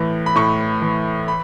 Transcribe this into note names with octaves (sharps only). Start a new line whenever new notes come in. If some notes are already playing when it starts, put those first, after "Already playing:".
Already playing: A2 E3
B5
A2 C#6
E3
B5